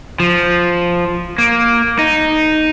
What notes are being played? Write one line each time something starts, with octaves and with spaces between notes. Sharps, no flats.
F3
A#3
D#4